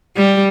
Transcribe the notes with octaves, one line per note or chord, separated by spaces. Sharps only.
G3